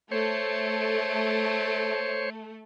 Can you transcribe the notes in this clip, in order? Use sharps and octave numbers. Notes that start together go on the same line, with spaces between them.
A3 C5 C#5